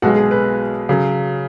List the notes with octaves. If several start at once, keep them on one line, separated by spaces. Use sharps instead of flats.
B1 B2 G#3 F#4
G#4
B4
C#3 F#3